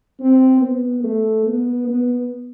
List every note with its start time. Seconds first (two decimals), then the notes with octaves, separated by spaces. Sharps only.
0.20 C4
0.61 B3
1.04 A3
1.46 B3
1.88 B3